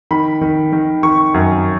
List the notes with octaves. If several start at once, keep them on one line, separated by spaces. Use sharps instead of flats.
D#3 B5
D#3
D#3
D#3 C#6
F#2